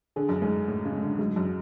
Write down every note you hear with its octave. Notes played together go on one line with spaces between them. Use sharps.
D3 G#4
F#2
G#2 G#4
A2 G#4
C#3
G#3
D3
G#2 F#3
F#2
F#3